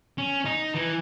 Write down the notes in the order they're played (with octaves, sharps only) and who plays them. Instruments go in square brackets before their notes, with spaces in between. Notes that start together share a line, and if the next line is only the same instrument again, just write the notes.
[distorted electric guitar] C#4
D#4
E3